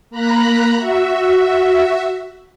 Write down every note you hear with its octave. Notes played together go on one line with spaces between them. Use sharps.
A#3 A#5 B5 F#6
F#4 E5